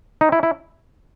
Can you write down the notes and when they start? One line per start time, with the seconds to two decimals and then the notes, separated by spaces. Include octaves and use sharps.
0.21 D#4
0.32 E4
0.43 E4